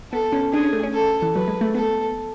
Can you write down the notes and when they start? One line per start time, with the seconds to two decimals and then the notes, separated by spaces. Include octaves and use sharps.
0.12 B3 A4
0.32 C#4
0.52 D4 G#4
0.63 C#4
0.73 A3
0.83 C#4
0.93 A4
1.22 E3
1.34 F#3 B4
1.48 G#3
1.61 A3
1.75 B3 A4